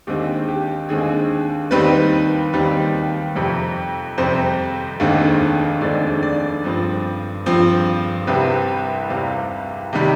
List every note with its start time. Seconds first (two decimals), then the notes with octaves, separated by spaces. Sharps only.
0.07 D#2 D3 G#3 C4 G4
0.48 G4
0.89 D#2 D3 G#3 C4 G#4
1.71 D#2 D#3 G3 C4 B4
2.53 D#2 D#3 G3 C4
3.35 F2 C3 G3 C4
4.18 F2 C3 G3 C4 C5
5.00 F1 D#2 D3 G#3 C4
5.81 F1 D#2 D3 G#3 C4 D5
6.23 D5
6.64 G2 F3 C4
7.46 G2 F3 C4
8.27 C2 C3 G3 C4 B4
9.09 C2 C3 G3 C4 F5
9.93 C3 D#3 G3